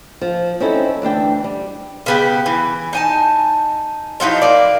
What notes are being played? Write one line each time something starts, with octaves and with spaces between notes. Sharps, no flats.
F3
C4 C#4 D#4 E4 A4
D2 E3 D4 G5
G3
C#3 B3 G4
E3
D#4 G#5 A5
F3 F#3 D#4 E4
A#3 D5